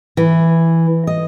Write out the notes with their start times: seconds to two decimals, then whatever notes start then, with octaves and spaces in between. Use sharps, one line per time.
0.17 E3
1.07 D#5